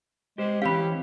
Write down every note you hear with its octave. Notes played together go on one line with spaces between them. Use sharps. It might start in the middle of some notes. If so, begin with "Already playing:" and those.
G#3 G4 C5
E3 C4 C#4 G4 F5 B5